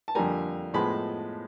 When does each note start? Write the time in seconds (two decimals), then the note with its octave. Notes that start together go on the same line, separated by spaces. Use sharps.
0.08 A5
0.15 F2 D3 G3 A#3 G#5 A#5
0.74 A2 F3 G#3 B3 A5 B5